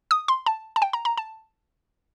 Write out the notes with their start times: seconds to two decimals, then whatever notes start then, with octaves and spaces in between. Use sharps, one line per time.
0.11 D#6
0.28 C6
0.46 A5
0.76 A5
0.82 G5
0.93 A#5
1.05 A#5
1.17 A5